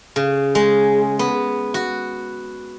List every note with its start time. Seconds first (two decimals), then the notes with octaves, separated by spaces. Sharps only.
0.16 C#3
0.55 G#3
1.19 B3
1.74 F#4